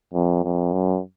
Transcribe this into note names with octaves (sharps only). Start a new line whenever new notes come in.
F2
F2
F#2